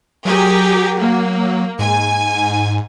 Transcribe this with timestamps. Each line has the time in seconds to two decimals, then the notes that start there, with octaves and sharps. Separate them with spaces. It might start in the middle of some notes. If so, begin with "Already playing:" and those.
0.25 F#3 G4 G#4 A#4
0.99 A#3
1.79 G#2 G#5